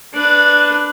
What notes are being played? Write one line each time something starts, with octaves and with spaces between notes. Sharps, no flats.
D4 B4